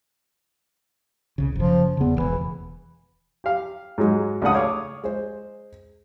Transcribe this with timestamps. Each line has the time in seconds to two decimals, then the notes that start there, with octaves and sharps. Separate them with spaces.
1.38 C2 C#3
1.55 F#1 C#3 F3
1.97 E2 C#3 B3
2.17 E1 C#2 E3
3.44 G4 F5
3.98 G#2 F#3 G#3
4.42 C#2 A3 D4 F#5 D#6
4.55 C#5 F5 D6
5.03 G#3 C5